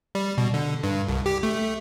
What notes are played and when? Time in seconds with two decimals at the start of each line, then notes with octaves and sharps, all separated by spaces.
0.15 G3
0.38 B2
0.54 D3
0.83 G2
1.08 C2
1.26 G4
1.43 A3